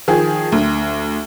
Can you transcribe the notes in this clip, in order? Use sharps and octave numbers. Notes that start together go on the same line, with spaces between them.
D#3 F3 G#4
D2